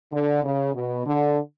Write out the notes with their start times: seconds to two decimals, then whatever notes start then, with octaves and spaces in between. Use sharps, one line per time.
0.12 D3
0.43 C#3
0.74 B2
1.05 D3